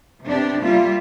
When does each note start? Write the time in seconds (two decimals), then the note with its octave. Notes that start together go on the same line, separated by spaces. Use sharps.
0.24 C3 B3 D4 G4
0.62 G3 A#3 F4 E5